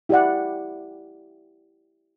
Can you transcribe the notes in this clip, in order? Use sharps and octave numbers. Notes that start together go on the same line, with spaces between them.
E4 G4 D5 F#5